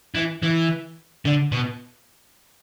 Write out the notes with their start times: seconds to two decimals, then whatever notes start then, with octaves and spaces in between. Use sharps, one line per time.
0.15 E3
0.43 E3
1.25 D3
1.52 B2